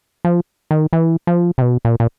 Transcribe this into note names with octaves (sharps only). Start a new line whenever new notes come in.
F3
D#3
E3
F3
C3
B2
A#2
A#2